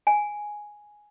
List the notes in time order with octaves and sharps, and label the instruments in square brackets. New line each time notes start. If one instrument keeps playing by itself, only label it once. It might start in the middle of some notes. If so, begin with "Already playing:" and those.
[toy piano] G#5